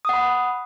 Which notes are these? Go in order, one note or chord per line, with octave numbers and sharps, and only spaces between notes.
F#5 B5 D#6